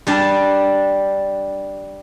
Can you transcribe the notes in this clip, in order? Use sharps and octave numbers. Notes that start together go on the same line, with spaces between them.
G3 D4 A5